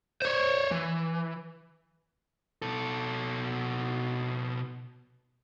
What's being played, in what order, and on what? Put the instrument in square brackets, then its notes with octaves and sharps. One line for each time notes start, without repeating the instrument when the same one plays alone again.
[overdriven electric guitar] C5 C#5
E3
[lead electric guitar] B2 A4